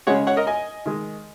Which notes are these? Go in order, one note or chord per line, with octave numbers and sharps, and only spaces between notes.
C#3 G#3 C#5 F#5
C#5 F#5
A#4 D#5
D#5 G#5
D#3 G#3